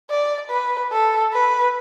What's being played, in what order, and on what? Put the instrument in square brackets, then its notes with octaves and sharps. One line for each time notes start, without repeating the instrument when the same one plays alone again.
[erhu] D5
B4
A4
B4